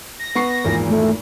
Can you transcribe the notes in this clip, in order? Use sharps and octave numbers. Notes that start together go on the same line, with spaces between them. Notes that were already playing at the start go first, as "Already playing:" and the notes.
A#6
B3 C#6 C7
G#1 E2 A#2
A3